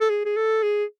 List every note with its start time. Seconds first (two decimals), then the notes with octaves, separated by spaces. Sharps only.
0.01 A4
0.10 G#4
0.25 G#4
0.36 A4
0.63 G#4